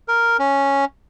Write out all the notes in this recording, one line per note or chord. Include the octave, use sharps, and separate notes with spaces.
A#4
C#4